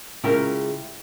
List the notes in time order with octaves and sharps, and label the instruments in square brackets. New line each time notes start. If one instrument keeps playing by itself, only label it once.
[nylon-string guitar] C#3 G#3 F4 [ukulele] E4 G4 A#4